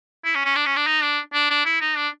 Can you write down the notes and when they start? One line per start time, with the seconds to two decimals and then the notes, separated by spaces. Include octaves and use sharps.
0.25 E4
0.35 C#4
0.45 C#4
0.56 D4
0.66 C#4
0.76 D4
0.87 D#4
1.03 D4
1.34 D4
1.50 D4
1.66 E4
1.81 D#4
1.97 D4